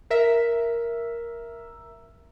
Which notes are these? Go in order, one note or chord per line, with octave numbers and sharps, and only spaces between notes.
A#4 E5